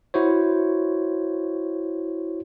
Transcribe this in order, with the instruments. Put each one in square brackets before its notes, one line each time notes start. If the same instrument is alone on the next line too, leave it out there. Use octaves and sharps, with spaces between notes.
[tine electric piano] E4 F#4 C5 C#5